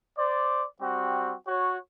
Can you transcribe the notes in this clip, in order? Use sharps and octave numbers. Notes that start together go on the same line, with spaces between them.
C5 D5
G3 C4 F#4
F#4 C#5